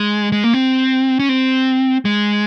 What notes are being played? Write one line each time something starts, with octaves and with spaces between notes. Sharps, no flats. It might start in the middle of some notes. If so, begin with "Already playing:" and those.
Already playing: G#3
G#3
A#3
C4
C#4
C4
G#3